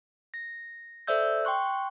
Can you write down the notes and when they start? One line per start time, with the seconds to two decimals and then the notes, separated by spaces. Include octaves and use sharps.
0.34 A#6
1.07 A4 C5 D5 E5 E6 G6
1.45 G5 C6 C#6 F#6